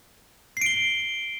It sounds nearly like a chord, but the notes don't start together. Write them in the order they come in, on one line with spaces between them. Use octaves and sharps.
C7 D7 G7